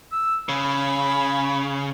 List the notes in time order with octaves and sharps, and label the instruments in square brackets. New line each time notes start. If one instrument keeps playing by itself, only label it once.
[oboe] E6
[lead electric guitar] C#3 [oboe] B5